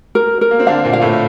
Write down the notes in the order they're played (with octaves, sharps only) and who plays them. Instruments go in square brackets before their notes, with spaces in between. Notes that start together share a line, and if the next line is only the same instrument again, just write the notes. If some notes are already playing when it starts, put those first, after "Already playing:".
[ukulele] A#4
A#4
[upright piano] A#3
C4
[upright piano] D3 D4 [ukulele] F5
[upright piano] A#2 A#3
[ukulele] F5
[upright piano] A2 A3